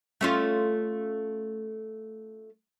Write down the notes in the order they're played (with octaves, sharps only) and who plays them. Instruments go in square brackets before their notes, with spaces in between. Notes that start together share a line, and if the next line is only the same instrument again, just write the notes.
[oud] A3 C#4 F4